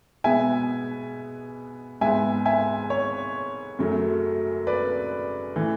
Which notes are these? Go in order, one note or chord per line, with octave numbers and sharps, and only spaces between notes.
B2 G#3 B3 E5 G#5
G#2 G#3 B3 E5 G#5
E5 G#5
C#5
F#2 C#3 F#3 A3
B4 D5
A2 E3 A3